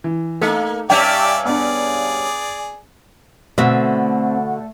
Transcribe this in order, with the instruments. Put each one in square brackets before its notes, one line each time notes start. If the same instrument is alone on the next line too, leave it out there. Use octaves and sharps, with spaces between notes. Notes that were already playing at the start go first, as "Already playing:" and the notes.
[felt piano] E3
[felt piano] A3 D#4 [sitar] A#3
[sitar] G2 C#4 [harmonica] G4 D5 E5 [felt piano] G5
[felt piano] B3 D4 [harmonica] G#4 D5
[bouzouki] B2 D3 [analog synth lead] A3 [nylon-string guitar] C4 E5